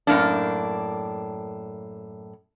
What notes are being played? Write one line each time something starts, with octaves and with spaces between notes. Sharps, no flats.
F#2 A2 A#3 D4